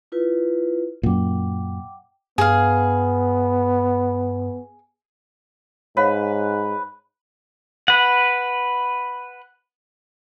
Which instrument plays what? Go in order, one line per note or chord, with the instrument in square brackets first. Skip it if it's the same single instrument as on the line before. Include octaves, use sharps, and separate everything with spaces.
[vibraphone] E4 F4 B4
[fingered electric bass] F#2 A#2 [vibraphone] F#5 G5 D6
[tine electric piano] G2 [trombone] B3 [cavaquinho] G#4 F5
[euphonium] G#2 [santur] B4 [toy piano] C#5 F5 F#5
[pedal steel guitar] B4 F#5